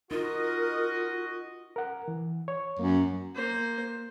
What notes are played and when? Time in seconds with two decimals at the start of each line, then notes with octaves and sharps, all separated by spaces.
0.11 D#4 F4 F#4 A#4 D#5
1.76 A#4 F#5
2.08 E3
2.48 C#5
2.79 F#2 A#3
3.35 A#3 C5